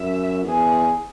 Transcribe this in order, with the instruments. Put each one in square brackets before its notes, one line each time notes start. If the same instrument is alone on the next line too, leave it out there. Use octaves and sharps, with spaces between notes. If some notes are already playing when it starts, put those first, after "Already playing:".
Already playing: [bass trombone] F#2 [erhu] E5
[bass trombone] E2 [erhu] G#4